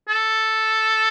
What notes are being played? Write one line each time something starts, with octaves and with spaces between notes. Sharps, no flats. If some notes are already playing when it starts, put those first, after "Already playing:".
A4